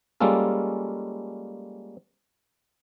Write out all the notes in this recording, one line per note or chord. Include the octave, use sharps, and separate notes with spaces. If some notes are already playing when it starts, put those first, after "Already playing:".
G3 G#3 A#3 C#4 F4 A4